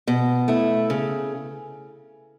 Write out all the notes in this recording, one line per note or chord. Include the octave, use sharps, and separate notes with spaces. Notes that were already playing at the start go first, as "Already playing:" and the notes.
B2
A3 E4
C#3